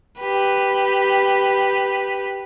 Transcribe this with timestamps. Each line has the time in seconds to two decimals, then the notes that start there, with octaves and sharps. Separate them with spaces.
0.20 G4 B4